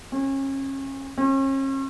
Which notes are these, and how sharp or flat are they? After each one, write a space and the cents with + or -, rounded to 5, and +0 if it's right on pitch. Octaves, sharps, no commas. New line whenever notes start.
C#4 -30
C#4 -40